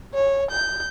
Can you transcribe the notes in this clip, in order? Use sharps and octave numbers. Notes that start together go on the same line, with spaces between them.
C#5
G6